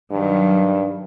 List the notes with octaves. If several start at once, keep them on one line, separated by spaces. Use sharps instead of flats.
G2 D#3 F#3